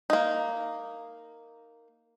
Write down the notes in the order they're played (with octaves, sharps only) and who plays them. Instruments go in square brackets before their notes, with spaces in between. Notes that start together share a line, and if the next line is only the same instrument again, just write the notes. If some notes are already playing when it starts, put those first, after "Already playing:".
[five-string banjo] A#3 D#4